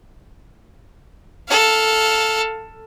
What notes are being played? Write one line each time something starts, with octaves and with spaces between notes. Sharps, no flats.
A4 F5